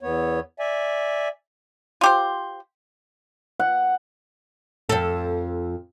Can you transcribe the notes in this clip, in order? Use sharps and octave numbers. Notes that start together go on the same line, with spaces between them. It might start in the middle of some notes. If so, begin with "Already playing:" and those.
E2 B3 C#5
D5 E5 G#5
F4 G4 C5
F#5
F2 A4